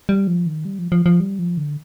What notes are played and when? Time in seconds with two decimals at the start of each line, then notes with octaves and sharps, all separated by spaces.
0.09 G3
0.27 F3
0.46 D#3
0.65 G3
0.79 F3
0.92 F3
1.06 F3
1.20 G3
1.39 F3
1.57 D3